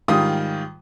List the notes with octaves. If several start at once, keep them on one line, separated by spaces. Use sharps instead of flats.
G#2 D#3 G3 F4 D#6